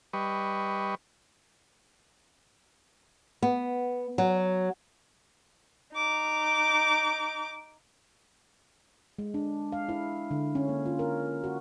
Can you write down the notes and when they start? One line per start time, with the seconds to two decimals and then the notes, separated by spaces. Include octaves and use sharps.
0.13 G3 B4 D#5 C#6
3.42 B3
4.18 F#3
5.95 D#4 D6
9.19 G#3
9.34 D4
9.72 F5
9.89 E4
10.31 D3
10.55 C#4
10.69 A#3
10.85 F4
10.99 A#4
11.44 F#4